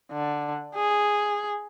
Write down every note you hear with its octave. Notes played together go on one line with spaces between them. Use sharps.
D3
G#4